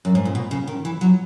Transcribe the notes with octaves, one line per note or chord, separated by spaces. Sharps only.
F#2
G#2
A#2
B2
C#3
D#3
E3
F#3